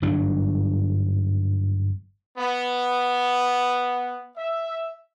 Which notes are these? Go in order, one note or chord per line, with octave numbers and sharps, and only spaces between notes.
G1 G#2 F#3 D4
B3
E5